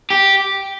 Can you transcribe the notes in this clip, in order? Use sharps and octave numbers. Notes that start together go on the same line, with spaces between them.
G4